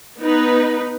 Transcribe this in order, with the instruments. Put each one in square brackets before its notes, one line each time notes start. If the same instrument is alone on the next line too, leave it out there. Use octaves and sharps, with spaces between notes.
[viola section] B3 D#4 B4